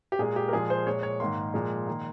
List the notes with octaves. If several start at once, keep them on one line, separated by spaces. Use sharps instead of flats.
G4
A#2 G#3 G#4
G4
A#4
A#2 F3 G#3 G#4
C5
A#2 G#3 C#5
C#5
G#2 D#3 A#3 C6
A#2 F3 G#3
D#3 A#3